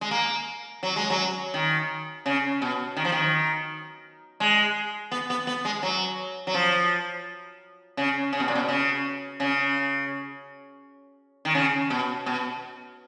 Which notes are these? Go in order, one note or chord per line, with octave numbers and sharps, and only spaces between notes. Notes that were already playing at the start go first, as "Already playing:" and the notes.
G#3
A#3
F#3
G#3
F#3
D#3
C#3
B2
D#3
F3
D#3
G#3
B3
B3
B3
G#3
F#3
F#3
F3
C#3
C#3
B2
A#2
B2
C#3
C#3
D#3
C#3
B2
B2